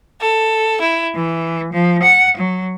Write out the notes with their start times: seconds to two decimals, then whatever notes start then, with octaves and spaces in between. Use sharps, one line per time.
0.19 A4
0.80 E4
1.15 E3
1.72 F3
2.02 F#5
2.36 F#3